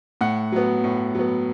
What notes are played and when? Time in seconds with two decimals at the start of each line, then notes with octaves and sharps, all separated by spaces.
0.21 A2 F#5
0.52 F#3 B3
0.84 A2
1.15 F#3 B3